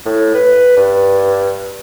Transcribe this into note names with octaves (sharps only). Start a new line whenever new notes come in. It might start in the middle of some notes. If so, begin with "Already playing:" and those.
A2
B4
G2